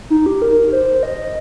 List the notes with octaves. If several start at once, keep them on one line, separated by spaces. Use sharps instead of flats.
D#4
G4
A#4
C5
D#5